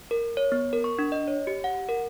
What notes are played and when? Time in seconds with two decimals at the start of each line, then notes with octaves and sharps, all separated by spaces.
0.11 A#4
0.37 C#5
0.52 B3
0.73 A#4
0.84 C#6
0.99 D4
1.12 D#5
1.28 C#5
1.47 G4
1.64 F#5
1.89 A#4